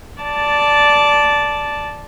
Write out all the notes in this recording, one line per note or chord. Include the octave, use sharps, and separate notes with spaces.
D5 A5